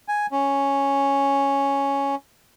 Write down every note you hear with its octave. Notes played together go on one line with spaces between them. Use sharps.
G#5
C#4